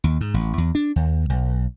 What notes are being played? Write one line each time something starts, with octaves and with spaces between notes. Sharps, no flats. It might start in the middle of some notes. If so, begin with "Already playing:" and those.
D#2
G#2
A1
E2
D4
D#2
B1